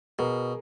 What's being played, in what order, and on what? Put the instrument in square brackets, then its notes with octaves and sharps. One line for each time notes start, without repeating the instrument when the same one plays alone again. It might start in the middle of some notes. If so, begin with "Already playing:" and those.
[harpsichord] B2 [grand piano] G#4 A#4